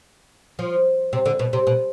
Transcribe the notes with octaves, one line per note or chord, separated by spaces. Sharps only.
F3
C3
D3
B2
C3
B2